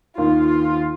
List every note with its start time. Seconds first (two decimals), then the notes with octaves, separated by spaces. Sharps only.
0.17 D#2 D#3 A#3 F4
0.48 F4